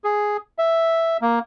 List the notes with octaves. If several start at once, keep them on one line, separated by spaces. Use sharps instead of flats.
G#4
E5
A#3